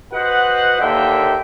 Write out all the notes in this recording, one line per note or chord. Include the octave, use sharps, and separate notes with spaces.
F#4 B4 C5 D#5 F#5
D#2 D3 A#3 D4 E5 G5